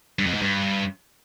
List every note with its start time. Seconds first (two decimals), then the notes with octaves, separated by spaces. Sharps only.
0.19 G2
0.26 F2
0.34 G#2
0.42 G2